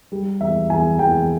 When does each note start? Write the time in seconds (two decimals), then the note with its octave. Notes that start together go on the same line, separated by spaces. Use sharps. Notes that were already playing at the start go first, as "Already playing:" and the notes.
0.12 G3
0.40 E2 E5
0.70 E2 G#5
0.99 E2 G5